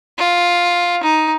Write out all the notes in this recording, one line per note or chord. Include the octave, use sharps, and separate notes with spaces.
F4
D#4